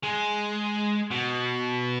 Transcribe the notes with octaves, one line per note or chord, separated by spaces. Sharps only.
G#3
B2